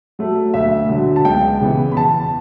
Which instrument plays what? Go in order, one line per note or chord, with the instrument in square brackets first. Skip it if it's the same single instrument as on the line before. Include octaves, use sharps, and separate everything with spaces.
[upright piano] F#3 A3
D2 E5
D3 F#3
A5
C#2 G5
C#3 E3 B3
B5
E2 A5